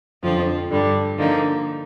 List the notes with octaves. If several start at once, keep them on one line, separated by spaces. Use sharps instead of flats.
F2 D3 F3 C4 F4
G2 D3 G3 D4
D3 F3 A#3 D#4